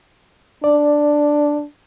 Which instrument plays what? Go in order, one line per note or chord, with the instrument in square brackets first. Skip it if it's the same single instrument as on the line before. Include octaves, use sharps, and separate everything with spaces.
[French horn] D4 [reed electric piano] D5